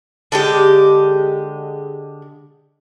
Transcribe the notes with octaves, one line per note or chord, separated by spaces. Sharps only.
D3 G#3 G4